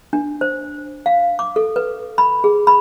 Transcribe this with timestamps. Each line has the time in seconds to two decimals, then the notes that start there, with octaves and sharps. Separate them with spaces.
0.13 D4
0.41 C5
1.06 F5
1.39 D6
1.56 A4
1.76 B4
2.18 B5
2.44 G#4
2.67 B5